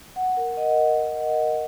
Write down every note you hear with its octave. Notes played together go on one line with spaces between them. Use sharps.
F#5
A#4
D#5